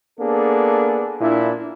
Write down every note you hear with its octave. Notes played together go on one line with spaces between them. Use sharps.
A#3 B3 D4 G#4 A4
A#2 D4 E4